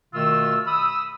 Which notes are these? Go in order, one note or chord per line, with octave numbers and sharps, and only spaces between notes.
B2 D#3 A3 F4 E6
B5 D#6 E6